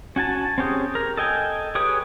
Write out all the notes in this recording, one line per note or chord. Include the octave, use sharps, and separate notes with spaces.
C#4 F#4 G#5 A5
C4 C#4 G4 G#4
A#4
A4 D#5 G5 G#5
G4 G#4 B4 C#5 D#6